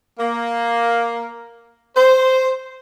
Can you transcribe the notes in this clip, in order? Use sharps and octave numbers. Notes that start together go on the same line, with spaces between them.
A#3
C5